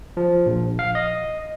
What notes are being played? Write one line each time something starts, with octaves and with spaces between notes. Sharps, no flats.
F3
A#1
F5
D#5